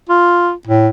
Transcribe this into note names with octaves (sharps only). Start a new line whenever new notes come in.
F4
A2